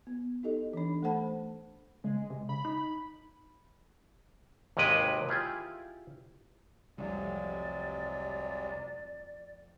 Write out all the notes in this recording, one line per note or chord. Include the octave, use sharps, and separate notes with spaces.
B3
D#4 E4 G4 A4 D#5
E3 D4
A3 A4 C5 F#5 A5 B5
C#3 G#3
C3
C#3 B5
D#4
G#1 D#2 C3 G#3 B4 G5
E4 F4 G4 G#4
C2 F2 C3 F3 F#3 G#3 A3 D5